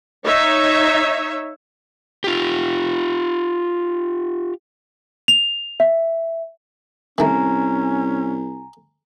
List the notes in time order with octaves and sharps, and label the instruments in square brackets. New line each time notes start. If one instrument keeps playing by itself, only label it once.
[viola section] D#4 C#5 E5
[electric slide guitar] F4 G4
[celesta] F7
E5
[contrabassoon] C2 [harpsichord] D#3 A3 [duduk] C#4 [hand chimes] G#5 A#5